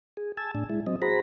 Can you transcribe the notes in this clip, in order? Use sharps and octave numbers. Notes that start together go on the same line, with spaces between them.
G#4
G#5 A5 E6
A2 D4
G#3 E4
F#3 C4 D#5
F#4 G#4 C5 A#5 B5